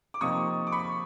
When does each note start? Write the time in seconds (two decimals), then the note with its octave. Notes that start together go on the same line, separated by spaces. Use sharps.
0.14 D6
0.21 C3 F3 A#3 D#4 C#6 D#6
0.67 D6
0.72 B5 C#6